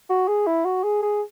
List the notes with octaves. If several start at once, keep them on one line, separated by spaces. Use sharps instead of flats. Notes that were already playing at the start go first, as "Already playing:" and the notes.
F#4
G#4
E4
F#4
G#4
G#4